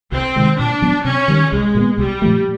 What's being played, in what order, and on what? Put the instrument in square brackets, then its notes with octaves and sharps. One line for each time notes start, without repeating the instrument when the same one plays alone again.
[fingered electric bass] C2 [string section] C4
[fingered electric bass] C3 D#3 G#3
[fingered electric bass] A#2 [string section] D4
[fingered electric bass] F#3 B3
[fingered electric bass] C3 [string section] C#4
[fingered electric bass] D#3 G3
[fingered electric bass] C2 [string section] G#3
[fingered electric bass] A#2 F#3
B3
[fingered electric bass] C2 [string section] G3
[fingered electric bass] A#2 F3 A3